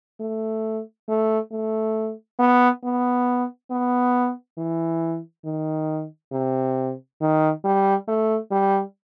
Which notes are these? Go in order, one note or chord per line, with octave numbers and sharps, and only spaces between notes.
A3
A3
A3
B3
B3
B3
E3
D#3
C3
D#3
G3
A3
G3